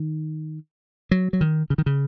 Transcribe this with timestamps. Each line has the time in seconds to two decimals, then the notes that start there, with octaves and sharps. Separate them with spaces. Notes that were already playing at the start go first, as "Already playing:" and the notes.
Already playing: D#3
1.11 F#3
1.33 F#3
1.41 D#3
1.70 C#3
1.78 D#3
1.86 C#3